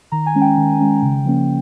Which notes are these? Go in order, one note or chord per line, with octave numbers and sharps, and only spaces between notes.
D#3 A#5
G#5
G#3 C#4
G5
D#3
G#3 C#4
C#3
F3 A#3 C#4